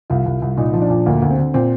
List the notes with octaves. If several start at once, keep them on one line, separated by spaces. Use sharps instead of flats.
C2 F4
C2
C2
A#2 D#4
F3
D4
A#2
D2 A#3
D2
C4
D3
A#2 C4